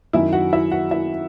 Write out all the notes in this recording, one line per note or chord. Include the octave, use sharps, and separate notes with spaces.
F#2 D#3 F#3 E4 E5
F#4 F#5
E4 E5
F#4 F#5
E4 E5